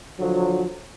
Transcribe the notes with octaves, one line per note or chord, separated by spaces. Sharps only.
D3 F3 F#3